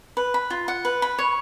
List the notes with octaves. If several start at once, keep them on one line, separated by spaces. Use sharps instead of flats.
B4
B5
F4
F#5
B4
B5
C#5